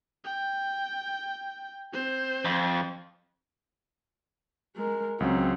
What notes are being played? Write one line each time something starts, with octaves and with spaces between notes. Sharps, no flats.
G5
C4 C5
F2
G#3 A#4
C#2 F#3 C4 C#4